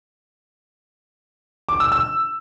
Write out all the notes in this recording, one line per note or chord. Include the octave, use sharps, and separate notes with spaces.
D6
E6
E6